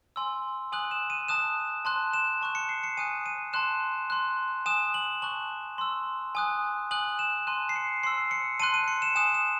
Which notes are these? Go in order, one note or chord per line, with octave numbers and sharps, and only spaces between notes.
G#5 C6 E6
G#5 D#6 F#6 F#7
E7
D#7
A5 D#6 F#6 E7
A5 C6 F#6
E7
A5 C#6 F#6
C#7
C7
C#7
G#5 D#6 F#6 D#7
D#7
A5 C6 F#6 E7
C6 F#6
G#5 D#6 F#6 E7
F#7
A5 C#6 F#6 F#7
C6 E6
G#5 D#6 F#6
G#5 D#6 F#6 F#7
E7
A5 C6 F#6 D#7
C7
C#7
C6 E6 C7
C#7
A5 C6 F#6 D#7
D#7
C#7
E7
G#5 D#6 F#6 E7
E7